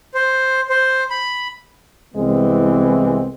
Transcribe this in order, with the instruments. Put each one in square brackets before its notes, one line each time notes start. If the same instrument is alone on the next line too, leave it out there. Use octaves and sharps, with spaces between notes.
[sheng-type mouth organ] C5
C5
B5
[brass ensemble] C2 E3 G#3 B3 C4